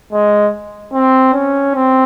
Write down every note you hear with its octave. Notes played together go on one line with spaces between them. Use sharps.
G#3
C4
C#4
C4